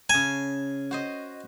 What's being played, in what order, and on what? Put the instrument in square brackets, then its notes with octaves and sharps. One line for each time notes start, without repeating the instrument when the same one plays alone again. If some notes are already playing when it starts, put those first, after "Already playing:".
[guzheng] C#3 A5 [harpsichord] G#5
[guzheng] F#4 C5 D#5